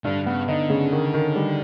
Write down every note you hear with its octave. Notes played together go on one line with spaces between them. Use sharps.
G2 D3
C#3 B3
D3 D#4
C#3
D#3
D#3
G3